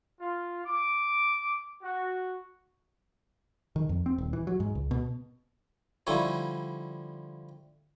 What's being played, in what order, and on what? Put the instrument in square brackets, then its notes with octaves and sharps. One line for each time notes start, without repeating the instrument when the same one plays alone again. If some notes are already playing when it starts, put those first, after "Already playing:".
[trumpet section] F4
D6
F#4
[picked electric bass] D#3
F2
C4
D#1
E3
F#3
G#2
C#2
B2
[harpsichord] D3 F3 G3 D#4 E4 C#5